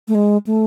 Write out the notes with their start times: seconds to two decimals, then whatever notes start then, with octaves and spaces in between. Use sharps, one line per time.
0.08 A3
0.15 G#3
0.46 A3